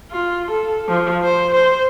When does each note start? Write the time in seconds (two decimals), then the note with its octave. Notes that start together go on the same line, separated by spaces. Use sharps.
0.12 F4
0.52 A4
0.89 F3
1.24 C5
1.55 C5